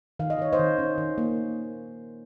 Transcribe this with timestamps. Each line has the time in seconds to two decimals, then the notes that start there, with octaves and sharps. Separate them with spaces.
0.19 D#3 F5
0.30 D#5
0.39 D#3 C#5
0.52 C5 D#5
0.59 D#3
0.78 C#4
0.98 D#3
1.18 A#3